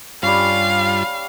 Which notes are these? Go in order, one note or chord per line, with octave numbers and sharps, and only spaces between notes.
G2 G3 C#4 F4 F5